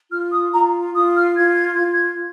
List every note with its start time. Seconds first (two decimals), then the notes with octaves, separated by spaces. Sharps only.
0.11 F4 F6
0.32 D#6
0.52 F4 A#5
0.95 F4 D#6
1.16 F6
1.36 F4 G#6
1.55 G#6
1.74 F4 G#6
1.92 G#6